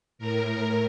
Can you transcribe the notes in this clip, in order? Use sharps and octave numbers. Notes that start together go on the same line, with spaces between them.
A2 A#4
A#4